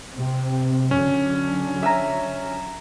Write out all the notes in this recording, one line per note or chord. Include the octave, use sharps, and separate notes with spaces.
C3 C4
D3 F#3 C#4
E5 G#5 A#5